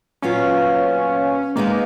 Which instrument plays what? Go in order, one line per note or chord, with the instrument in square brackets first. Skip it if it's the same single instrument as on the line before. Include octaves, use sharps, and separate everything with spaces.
[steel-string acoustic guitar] A#2 F#3 B3 F4 [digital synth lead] C#4
[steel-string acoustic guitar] D#3 G#3 B3 D#4 [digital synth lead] A#3